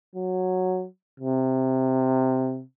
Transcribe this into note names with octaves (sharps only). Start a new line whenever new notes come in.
F#3
C3